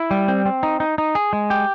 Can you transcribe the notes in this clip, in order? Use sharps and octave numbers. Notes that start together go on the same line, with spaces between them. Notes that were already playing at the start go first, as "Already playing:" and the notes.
Already playing: E4
G3
C4
C4
D#4
D#4
D#4
G#4
G#3
G4